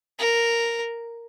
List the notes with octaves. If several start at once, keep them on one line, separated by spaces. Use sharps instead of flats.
A#4